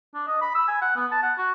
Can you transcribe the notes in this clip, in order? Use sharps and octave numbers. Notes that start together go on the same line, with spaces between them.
D4
D#5
B5
E6
G#5
F#5
B3
A5
F#5
F#4